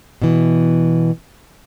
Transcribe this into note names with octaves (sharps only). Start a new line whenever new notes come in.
B2 E3